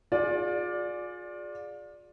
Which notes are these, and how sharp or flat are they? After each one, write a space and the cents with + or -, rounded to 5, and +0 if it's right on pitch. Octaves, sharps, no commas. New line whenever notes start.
F4 +35 G#4 +0 D5 +0